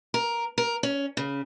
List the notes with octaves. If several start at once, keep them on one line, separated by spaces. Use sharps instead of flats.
A#4
A#4
C#4
C#3